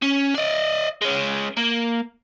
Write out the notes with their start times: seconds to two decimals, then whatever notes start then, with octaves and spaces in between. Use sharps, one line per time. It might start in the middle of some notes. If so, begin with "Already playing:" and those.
0.02 C#4
0.34 D5 D#5
1.01 G#3 C#4
1.57 A#3